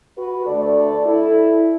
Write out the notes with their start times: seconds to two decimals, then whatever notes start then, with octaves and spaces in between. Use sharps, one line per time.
0.17 F#4 B4
0.46 D2 D3 A3 A4 D5
1.05 E4 A4